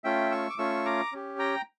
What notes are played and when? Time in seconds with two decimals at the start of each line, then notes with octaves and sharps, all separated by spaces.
0.04 A3 C#4 F4 E5 G5
0.31 C#6 E6
0.50 D6
0.58 A3 C#4 F4 C#6 E6
0.85 A#5 D6
1.12 C#4 G4
1.39 G5 A#5